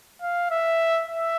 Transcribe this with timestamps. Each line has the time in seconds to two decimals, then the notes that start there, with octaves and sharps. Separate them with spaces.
0.22 F5
0.51 E5
1.08 E5